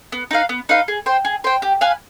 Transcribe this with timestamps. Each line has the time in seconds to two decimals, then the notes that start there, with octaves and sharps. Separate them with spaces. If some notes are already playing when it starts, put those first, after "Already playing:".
0.12 B3
0.31 D#4 B4 F5
0.49 B3
0.69 D#4 B4 F5
0.88 G#4
1.06 C5 G5
1.25 G#4
1.44 C5 G5
1.62 G4
1.81 B4 F5 G#5